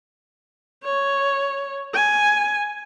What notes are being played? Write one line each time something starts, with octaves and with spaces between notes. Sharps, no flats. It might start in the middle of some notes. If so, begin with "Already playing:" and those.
C#5
G#5